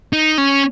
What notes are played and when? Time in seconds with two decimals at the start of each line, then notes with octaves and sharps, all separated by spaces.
0.13 D#4
0.38 C#4